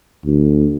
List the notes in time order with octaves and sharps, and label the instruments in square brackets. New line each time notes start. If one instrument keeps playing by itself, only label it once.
[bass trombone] D2